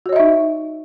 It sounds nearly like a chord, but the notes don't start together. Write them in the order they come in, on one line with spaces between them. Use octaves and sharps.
F#4 C#5 D#5 E5 D#4